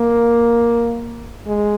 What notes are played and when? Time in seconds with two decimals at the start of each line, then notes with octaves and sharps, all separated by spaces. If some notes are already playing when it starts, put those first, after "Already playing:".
Already playing: A#3
1.47 G#3